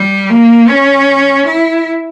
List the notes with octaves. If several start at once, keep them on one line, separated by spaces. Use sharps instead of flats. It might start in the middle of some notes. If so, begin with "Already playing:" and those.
Already playing: G3
A#3
C#4
E4